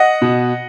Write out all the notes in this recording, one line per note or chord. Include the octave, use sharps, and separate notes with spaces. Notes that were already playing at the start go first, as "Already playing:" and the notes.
Already playing: D#5 F#5
B2